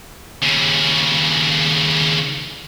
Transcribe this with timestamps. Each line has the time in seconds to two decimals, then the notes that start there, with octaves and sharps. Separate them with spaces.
0.43 D#2 C#3